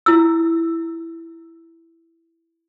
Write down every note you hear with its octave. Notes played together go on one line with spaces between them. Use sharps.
E4 E6